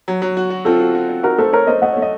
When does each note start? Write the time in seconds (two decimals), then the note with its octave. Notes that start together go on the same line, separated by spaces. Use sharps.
0.08 F#3
0.22 F#3
0.37 F#4
0.50 F#4
0.65 C4 F4 A4
0.80 F#4
0.95 F#4
1.09 C4
1.23 D#4 F#4 A#4
1.38 A3 A4 C5
1.53 A3 A#4 C#5
1.67 A3 C5 D#5
1.82 A3 D#5 F#5
1.93 A3 C#5
2.02 D#5